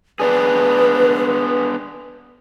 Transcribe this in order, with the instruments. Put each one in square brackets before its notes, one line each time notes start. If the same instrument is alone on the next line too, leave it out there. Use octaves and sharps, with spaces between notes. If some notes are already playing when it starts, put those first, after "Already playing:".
[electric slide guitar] B3 D4 G#4 [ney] B4